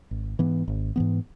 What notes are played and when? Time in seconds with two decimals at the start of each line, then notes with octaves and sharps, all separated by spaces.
0.11 G#1
0.39 G#2 E3 B3
0.68 G#1
0.96 G#2 E3 B3